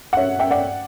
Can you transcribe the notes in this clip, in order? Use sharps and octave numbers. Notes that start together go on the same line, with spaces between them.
F#5
C#5 E5
E5 G5
D5 F#5